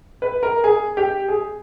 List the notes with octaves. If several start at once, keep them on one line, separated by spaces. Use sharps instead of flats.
B4
A#4
G#4
G4
G#4